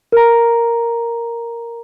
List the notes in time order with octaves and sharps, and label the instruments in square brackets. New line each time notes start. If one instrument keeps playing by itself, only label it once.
[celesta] A#4 A#5